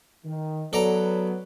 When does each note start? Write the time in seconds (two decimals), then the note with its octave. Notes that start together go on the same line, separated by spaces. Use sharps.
0.25 D#3
0.73 F#3 B3 A4 D5 A#5